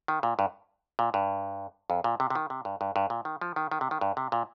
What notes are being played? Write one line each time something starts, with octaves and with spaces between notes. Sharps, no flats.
D#3
A#2
G2
A#2
G2
F2
A#2
C3
C3
D#3
C3
G2
G2
G2
A#2
D#3
F3
D#3
D#3
C3
D#3
G2
C3
A#2